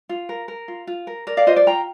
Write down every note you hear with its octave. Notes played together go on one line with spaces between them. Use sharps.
F4
A#4
A#4
F4
F4
A#4
A#4 D5
D5 F5
F4 C5 D#5
D5
F4 G5 A#5